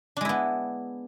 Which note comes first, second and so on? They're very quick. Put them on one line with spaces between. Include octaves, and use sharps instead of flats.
D4 G#3 E4 B3